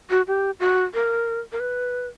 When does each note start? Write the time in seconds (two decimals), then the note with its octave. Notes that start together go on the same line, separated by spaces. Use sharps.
0.10 F#4
0.27 G4
0.60 F#4
0.94 A#4
1.52 A#4
1.60 B4